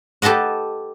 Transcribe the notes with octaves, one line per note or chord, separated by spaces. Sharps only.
G4 A4 B4 D#5 F#5